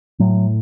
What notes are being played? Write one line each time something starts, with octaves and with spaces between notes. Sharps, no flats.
A2 F#3